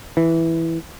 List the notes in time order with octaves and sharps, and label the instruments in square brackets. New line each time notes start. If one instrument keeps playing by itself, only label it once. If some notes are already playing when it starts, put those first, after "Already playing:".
[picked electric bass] E3